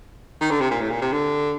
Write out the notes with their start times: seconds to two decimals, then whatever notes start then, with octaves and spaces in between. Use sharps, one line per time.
0.41 D#3
0.50 D3
0.61 C3
0.71 A#2
0.81 A2
0.90 A#2
1.02 C3
1.12 D3